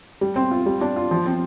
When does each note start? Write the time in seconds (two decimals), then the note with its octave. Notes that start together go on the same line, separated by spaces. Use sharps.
0.21 G3
0.36 C4
0.51 F4
0.66 G3
0.81 D4
0.96 F4
1.11 F3
1.26 C4